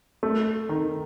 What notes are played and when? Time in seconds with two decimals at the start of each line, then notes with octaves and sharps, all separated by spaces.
0.23 A3
0.69 D#3